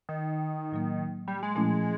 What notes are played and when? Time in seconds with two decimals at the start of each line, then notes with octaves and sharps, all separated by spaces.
0.09 D#3
0.72 A2 F#3 A#3
1.28 G3
1.43 G#3
1.56 A#2 F3 A3 C#4 E4